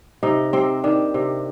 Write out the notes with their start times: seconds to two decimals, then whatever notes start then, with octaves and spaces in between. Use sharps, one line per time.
0.23 C3 D#4
0.53 C3 C4
0.84 D#3 D4
1.14 C3